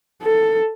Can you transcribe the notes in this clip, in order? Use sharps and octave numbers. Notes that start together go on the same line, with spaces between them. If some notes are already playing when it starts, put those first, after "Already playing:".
A4